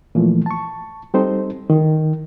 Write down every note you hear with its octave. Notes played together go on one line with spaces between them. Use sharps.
A#2 E3 F3 A3
A5 C#6
G3 C4 D#4 A4 C5
D#3